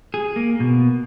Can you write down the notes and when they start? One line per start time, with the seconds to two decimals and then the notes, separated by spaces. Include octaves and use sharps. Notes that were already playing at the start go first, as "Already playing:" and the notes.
0.14 G#4
0.36 A#3
0.60 B2